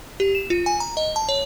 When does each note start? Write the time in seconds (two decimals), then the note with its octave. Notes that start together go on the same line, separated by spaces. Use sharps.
0.20 G4
0.35 E7
0.50 F4
0.66 G#5
0.80 A#5
0.97 D#5
1.16 A5
1.29 C#5